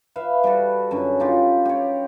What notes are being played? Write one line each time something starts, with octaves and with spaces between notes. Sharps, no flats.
B4 E5 F5
G3 F#4 A4
F#2 D3 C#4
D#4 F4 G4
G4 C#5